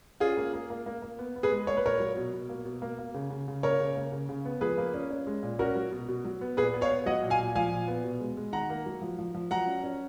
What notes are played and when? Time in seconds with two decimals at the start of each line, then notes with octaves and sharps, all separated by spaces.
0.20 C#4 F4 G#4
0.37 A#3
0.53 A#3
0.70 A#3
0.86 A#3
1.02 A#3
1.19 B3
1.36 B3
1.43 G#4 B4
1.51 G#3
1.67 A#3 C#5
1.77 B4
1.84 A#2 A#4 C#5
2.00 F#3
2.17 B2
2.33 B2
2.49 A#3
2.65 B2
2.82 A#3
2.99 A#3
3.14 C#3
3.30 C#3
3.48 C#3
3.63 A#3 A#4 C#5
3.80 C#3
3.96 A#3
4.12 C#3
4.29 C#3
4.45 B3
4.61 F3 G#4 B4
4.78 A#3
4.94 C#4
5.10 C#4
5.27 G#3
5.43 A#2
5.59 C#4 F#4 A#4
5.75 F#3
5.92 B2
6.08 B2
6.24 F#3
6.41 B3
6.57 A#2 G#4 B4
6.74 B3
6.81 C#5 F5
6.90 B3
7.06 F#3 D#5 F#5
7.22 A#2
7.30 F5 G#5
7.39 A#2
7.55 F3 F5 G#5
7.71 A#2
7.88 B3
8.04 B2
8.20 G#3
8.37 G#3
8.53 D#3 F#5 A#5
8.70 A#3
8.86 F#3
9.01 F3
9.19 F3
9.35 F3
9.51 F#3 F#5 A#5
9.67 C#4
9.83 C#4